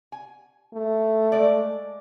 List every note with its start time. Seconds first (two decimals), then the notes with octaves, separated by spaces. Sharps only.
0.12 G#5
0.74 A3
1.32 G#3 D5